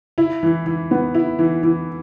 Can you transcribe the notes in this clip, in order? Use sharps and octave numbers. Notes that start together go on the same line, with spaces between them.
E4
E3
E3
B3
E4
E3
E3